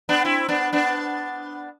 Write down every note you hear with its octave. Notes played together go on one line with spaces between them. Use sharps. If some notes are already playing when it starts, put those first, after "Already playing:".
B3 D4
C4 E4
B3 D4
B3 D4